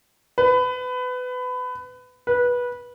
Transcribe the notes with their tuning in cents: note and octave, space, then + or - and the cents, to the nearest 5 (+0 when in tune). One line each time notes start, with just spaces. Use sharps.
B4 +25
B4 -15